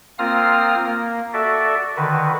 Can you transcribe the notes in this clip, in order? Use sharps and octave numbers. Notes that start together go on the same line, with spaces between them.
A#3 C4 F4 F5 D#6 F6
A#3
F#4 A4 D5 E5
D3 D#3 F#4 B4